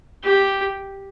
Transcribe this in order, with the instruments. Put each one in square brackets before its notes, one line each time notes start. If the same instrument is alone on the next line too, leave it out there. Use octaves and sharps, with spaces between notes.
[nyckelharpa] G4